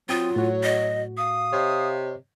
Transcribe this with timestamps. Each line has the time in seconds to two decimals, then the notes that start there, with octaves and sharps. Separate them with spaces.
0.09 F#3 C4 F4 G5 D#6
0.36 A2 F#4 C#5
0.63 D#5
1.17 F5 D#6
1.53 C3 C#5 D#5